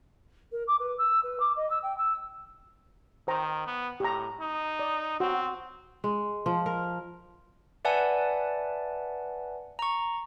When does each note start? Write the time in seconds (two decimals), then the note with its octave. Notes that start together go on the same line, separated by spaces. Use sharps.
0.52 A#4
0.68 D6
0.80 B4
0.98 E6
1.23 B4
1.40 D6
1.56 D#5
1.70 E6
1.83 G5
1.98 E6
3.28 D#3 C5 G5 A#5
3.67 B3
4.00 A2 G4 A#5
4.40 D#4
4.79 D5
5.20 C4 F#4
6.04 G#3
6.46 F3
6.66 A#4
7.85 B4 D5 E5 F#5 G#5 A5
9.79 A#5 C#6